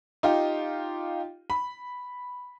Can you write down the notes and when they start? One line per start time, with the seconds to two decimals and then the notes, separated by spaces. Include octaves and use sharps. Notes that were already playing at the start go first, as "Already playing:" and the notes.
0.23 D#4 F4 G4
1.50 B5